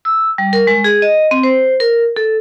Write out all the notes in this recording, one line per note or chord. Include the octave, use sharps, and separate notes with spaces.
E6
G3
A#4
G#3
G#4
D#5
C4
C5
A#4
A4